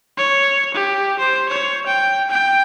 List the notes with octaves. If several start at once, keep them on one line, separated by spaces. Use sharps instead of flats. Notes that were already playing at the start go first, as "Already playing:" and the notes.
C#5
G4
C5
C#5
G5
G5